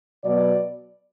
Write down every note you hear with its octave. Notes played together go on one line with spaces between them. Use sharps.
B2 F#3 B3 D5